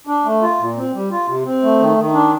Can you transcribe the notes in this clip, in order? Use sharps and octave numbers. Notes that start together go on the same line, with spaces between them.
D4
A3
F4
A#2
C4
G3
F4
C3
C4
A3
D#3
D#3
D4